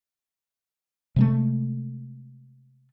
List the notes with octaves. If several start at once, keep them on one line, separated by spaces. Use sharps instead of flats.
C3 G#3 A3